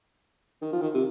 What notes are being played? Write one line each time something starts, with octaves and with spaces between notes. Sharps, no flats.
D#3
F3
D#3
C3